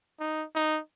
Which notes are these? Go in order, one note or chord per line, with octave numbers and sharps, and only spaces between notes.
D#4
D#4